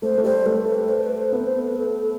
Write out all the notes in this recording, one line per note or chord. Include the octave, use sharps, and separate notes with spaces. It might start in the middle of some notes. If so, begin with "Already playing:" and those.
A3 C5
A3
G3 C5
A3 B4
A4
B4
C5
B4
C5
B3 B4
C5
B4
A4